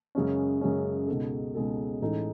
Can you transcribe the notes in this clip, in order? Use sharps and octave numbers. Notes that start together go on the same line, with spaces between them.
F#2 C#3 G#3 C#4
F#2 C#3 G#3 C#4
C#2 B2 G#3 D#4 A4
C#2 B2 G#3 D#4 A4
A1 A2 G#3 D#4 A4